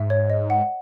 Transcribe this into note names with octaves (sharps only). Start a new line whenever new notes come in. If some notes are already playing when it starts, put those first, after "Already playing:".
Already playing: G#2 E5
C#5
D#5
F#5